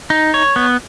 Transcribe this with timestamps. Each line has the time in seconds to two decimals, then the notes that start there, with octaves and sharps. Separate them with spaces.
0.10 D#4
0.34 C#5
0.56 B3